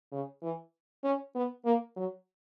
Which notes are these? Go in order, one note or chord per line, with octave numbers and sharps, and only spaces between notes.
C#3
E3
C#4
B3
A#3
F#3